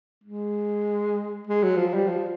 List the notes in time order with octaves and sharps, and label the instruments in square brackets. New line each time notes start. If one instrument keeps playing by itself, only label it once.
[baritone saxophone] G#3
G#3
F#3
F3
G3
F3